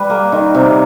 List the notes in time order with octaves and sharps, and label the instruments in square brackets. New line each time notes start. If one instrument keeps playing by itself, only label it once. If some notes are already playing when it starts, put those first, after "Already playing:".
Already playing: [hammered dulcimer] G3 B4
A#3
D#3
C3